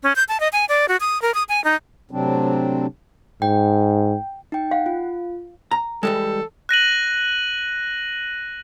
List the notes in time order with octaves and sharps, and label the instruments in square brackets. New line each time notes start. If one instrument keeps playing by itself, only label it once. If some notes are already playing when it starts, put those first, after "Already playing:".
[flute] C#4
G6
A5
D#5
G#5
D5
F#4
D#6
A#4
D#6
G#5
D#4
[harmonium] A2 C3 F#3 C4 D4
[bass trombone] G#2 [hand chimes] G5
[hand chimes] D#4 G5
[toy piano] F5 [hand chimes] F#5
[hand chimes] F4
[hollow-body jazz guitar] A#5
[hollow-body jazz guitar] E3 G3 G#3 [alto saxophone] A4
[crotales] F#6 A#6 D#7 F#7